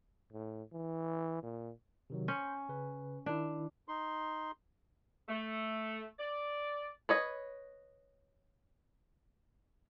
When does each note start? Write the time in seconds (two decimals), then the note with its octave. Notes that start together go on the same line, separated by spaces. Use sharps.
0.33 A2
0.73 E3
1.43 A#2
2.10 C3 D#3 F#3
2.28 C#4 C6 G6
2.69 C#3 B4
3.26 D#3 D4 E4
3.88 D#4 C6
5.28 A3
6.19 D5
7.09 B4 C#5 D#5